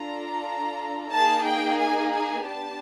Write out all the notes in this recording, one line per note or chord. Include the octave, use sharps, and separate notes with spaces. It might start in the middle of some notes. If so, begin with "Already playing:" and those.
Already playing: D4 F4 A4 A#5
A#3 D#4 G#4 A5
G5
G#5
G#5
B3 D4 G4 A5